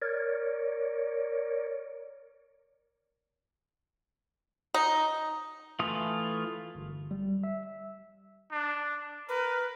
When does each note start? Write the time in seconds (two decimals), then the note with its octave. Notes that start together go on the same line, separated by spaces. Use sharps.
0.02 A#4 C#5 D5
4.74 D#4
5.79 E3 A3 F4 D#6
6.75 G1
7.11 G3
7.44 E5
8.52 D4
9.29 A#4 B4